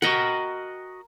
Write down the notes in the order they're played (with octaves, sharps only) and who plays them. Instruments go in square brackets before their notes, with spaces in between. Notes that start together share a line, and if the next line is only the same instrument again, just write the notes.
[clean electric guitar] F#4 D#5 F#5 [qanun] A#4 G5